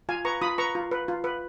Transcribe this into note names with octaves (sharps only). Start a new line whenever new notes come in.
F4 F5 G#5
B4 A#5 C#6
F4 B5 D#6
B4 A#5 C#6
F4
B4
F4
B4